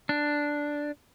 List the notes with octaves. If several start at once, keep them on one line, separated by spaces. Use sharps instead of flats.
D4